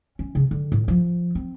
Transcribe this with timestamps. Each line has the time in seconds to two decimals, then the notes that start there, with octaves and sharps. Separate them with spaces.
0.19 C#4
0.35 C#3
0.51 D3
0.72 A2
0.88 F3
1.35 C4